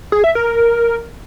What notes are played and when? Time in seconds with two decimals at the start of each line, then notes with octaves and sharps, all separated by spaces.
0.12 G#4
0.24 E5
0.35 A#4
0.47 A#4